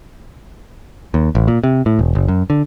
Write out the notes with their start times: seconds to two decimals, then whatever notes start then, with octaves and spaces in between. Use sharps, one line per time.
1.14 D#2
1.35 A1
1.48 A#2
1.64 C3
1.86 A2
1.99 E1
2.15 F#1
2.28 F#2
2.50 D3